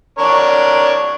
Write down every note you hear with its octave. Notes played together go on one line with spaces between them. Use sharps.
D4 A#4 C#5